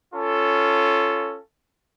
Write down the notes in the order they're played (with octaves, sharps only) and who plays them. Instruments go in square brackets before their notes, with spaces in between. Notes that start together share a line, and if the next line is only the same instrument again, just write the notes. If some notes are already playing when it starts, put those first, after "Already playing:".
[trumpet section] C#4 F4 A4